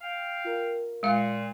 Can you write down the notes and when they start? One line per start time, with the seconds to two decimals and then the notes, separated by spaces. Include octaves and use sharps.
0.01 F5 G5
0.44 F4 A#4
1.03 A#2 G#3 F5